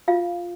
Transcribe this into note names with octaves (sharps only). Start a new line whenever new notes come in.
F4 F5